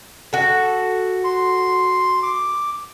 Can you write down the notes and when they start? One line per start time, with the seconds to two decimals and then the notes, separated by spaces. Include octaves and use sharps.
0.33 F#4 A4
1.24 C6
2.23 D6